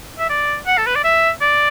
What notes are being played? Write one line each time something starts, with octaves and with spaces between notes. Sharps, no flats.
E5
D5
F#5
A4
B4
D5
E5
D5